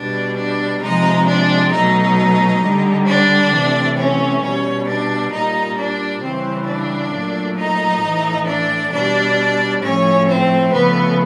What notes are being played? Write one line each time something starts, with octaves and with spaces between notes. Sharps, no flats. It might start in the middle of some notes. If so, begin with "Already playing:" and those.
Already playing: B2 G3 D4 D5
D4 D5
C3 F3 G#3 D#4 D#5
D4 D5
B2 F#3 A3 D#4 D#5
D3 G3
D4 D5
C3 E3 A3
C#4 C#5
B2 G3 C#4 C#5
D4 D5
A#2 G3 D#4 D#5
D4 D5
C#3 E3 G3 C4 C5
D4 D5
A#2 F#3 A3
D#4 D#5
A2 E3 A3
D4 D5
B2 G3 D4 D5
A2 F3 A3 C#4 C#5
C4 C5
C#3 F3 A3 B3 B4